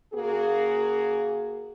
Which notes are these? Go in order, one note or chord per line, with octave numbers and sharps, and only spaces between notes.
C#3 A#3 F#4 G#4